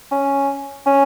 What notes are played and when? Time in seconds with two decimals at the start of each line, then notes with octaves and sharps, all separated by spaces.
0.12 C#4
0.86 C#4